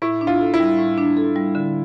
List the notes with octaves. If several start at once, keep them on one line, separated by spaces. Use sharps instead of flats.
A2 E4
D4
F4
A4
E4
G3
A2
D4
A4
G3
D3